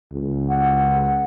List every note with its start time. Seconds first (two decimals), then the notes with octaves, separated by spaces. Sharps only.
0.12 C#2
0.49 F#5